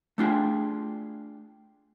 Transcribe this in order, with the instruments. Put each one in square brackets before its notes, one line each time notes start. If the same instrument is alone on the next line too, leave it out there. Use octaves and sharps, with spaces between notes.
[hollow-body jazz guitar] A3 D4 F4 G4 G#4